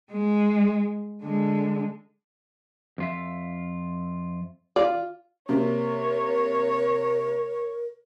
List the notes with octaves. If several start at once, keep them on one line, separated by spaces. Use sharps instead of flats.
G#3
D3 G#3
F2 F4 E5
F4 D5
C3 A#3 A#4 C#5